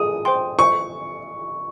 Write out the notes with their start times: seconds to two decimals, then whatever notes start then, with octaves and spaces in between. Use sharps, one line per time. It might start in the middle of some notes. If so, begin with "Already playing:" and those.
Already playing: G#4 D#6
0.25 C5 G5 C6
0.59 C5 C#6